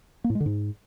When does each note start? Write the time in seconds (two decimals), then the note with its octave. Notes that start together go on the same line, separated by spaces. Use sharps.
0.24 A#3
0.30 A2
0.35 G#3
0.40 D3
0.46 G#2